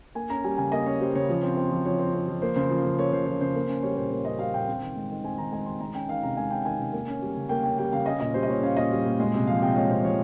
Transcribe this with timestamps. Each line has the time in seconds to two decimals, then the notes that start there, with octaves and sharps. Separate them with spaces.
0.15 A#3 G#5
0.30 C#4 A#5
0.44 G3 G#5
0.58 C#3 G#5
0.72 A#3 D#5
0.86 C#4 C#5
1.01 G3 C5
1.15 C#3 C#5
1.29 F3
1.42 C4
1.56 C4
1.71 F3
1.85 F3 C#5
1.99 C4
2.14 C4
2.28 F3
2.42 A#3 C5
2.56 C#3 C5
2.70 F3
2.85 C#3
2.98 A#3 C#5
3.12 C#3 C5
3.26 F3 C#5
3.41 C#3 C5
3.55 A#3
3.69 C#4
3.82 G3 C#5
3.96 A#2 C5
4.11 A#3 C#5
4.25 C#4 D#5
4.39 G3 F5
4.54 A#2 G5
4.68 C4
4.82 D#3
4.96 G#3
5.11 D#3
5.23 C4 G#5
5.38 D#3 A#5
5.52 G#3 G#5
5.66 D#3 C6
5.80 G#3 A#5
5.95 C#4 G5
6.09 D#3 F5
6.23 C3 A#5
6.37 G#3 G#5
6.51 C#4 G5
6.65 D#3 G#5
6.79 C3
6.93 A#3
7.08 C#4
7.22 G3
7.36 C#3
7.49 A#3 G5
7.63 C#4 G5
7.79 G3 G5
7.92 C#3 F5
8.06 C#4 D#5
8.20 A#2 D#5
8.34 G3 C5
8.43 D#5
8.48 A#2 C#5
8.62 C#4 F5
8.77 A#2 D#5
8.92 G3
9.05 A#2
9.20 G#3
9.34 C3
9.47 F3 F5
9.62 C3 G5
9.76 G#3 C#5
9.89 C3 C5
10.03 F3 C#5